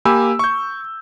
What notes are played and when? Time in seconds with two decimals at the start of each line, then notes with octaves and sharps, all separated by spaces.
0.05 A#3 G4 G#5 B5 E6
0.39 C#6 G6